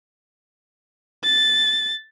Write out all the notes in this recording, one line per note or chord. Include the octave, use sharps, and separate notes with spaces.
A6